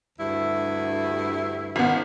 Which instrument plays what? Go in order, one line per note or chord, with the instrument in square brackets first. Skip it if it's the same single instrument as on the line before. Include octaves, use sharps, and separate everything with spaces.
[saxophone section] D2 G2 E4
[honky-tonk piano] G#1 B3